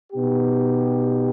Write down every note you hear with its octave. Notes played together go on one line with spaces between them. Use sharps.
B2 B3 D#4 G4